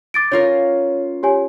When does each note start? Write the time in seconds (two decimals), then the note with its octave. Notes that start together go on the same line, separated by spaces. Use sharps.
0.14 D6 A6 D7
0.32 C#4 F4 A#4 C#5
1.23 G4 C#5 G#5